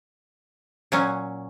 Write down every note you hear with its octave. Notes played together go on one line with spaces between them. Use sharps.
A#2 F#3 C#4